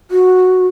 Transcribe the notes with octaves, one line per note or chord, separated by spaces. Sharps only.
F#4